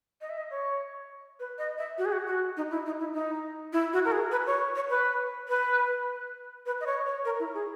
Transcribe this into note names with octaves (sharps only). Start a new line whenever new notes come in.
D#5
E5
D#5
C#5
B4
D#5
E5
F#4
G#4
F#4
F#4
D#4
E4
D#4
E4
D#4
E4
F#4
A#4
G#4
B4
C#5
C#5
B4
B4
B4
D#5
C#5
C#5
A#4
E4
G#4